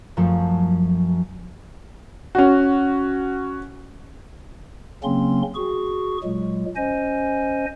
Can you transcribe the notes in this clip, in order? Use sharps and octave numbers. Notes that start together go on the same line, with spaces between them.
F#2 F3 A3 A4
C#4 F#4
C#3 F#3 A#3 C4 C#4 C6
F#4 G#4 C#6
A#2 F#3 G#3
C#4 C5 D#5 G#5